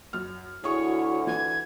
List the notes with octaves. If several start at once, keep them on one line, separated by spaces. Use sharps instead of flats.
F#2 F6
D2 E4 F#4 G#4 C#5 C#6
E3 G#6